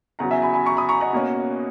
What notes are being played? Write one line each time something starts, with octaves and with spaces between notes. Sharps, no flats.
E2 C#3 F#3 F#5 A#5
E5 G#5
G#5 B5
G#5 B5
A#5 C#6
B5 D#6
A#5 C#6
D#5 F#5
B2 A#3 C#4